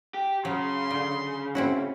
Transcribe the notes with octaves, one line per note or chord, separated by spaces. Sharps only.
G4
C#3 F#3 C6
D3
C4 C#4 E4 F#4